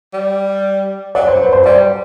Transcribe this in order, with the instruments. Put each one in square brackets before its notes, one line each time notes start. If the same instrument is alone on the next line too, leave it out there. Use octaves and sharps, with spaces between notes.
[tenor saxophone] G3
[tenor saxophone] F#3 [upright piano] D5
[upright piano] C5
B4
C5
[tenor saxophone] G3 [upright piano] D5